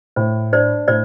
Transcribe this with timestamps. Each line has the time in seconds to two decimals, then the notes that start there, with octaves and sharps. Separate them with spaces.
0.16 A2 C5
0.53 D4 C5 D5
0.88 A2 C5 D5